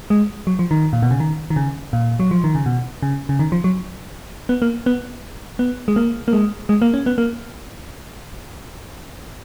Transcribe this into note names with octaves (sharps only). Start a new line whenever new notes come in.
G#3
F#3
F3
D#3
A#2
B2
C#3
D#3
D#3
C#3
A#2
F#3
F3
D#3
C#3
B2
C#3
C#3
D#3
F3
F#3
B3
A#3
B3
B3
G#3
A#3
A#3
G#3
G#3
A#3
C#4
B3
A#3